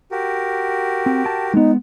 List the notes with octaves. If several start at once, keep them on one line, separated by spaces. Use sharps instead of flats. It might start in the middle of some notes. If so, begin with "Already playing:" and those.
F#4 G4 A#4
C4
G5 A5
G#3 B3 D#4